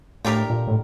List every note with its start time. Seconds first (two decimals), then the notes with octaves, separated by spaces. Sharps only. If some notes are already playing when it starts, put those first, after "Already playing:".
0.25 A2 A3 D4 G4 A#4
0.50 A#2
0.68 A2